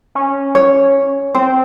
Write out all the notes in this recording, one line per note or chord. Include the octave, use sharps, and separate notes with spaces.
C#4
C#5
C4 C5